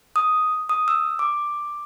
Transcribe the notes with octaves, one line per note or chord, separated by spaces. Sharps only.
D#6
D#6
E6
D6